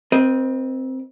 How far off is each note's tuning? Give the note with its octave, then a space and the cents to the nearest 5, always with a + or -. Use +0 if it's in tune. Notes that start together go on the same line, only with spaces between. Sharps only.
C4 +0 A#4 +45 D#5 +0